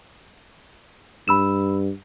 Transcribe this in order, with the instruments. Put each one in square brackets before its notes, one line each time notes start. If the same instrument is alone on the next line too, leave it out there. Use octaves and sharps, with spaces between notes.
[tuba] G2 [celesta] B5 E6 E7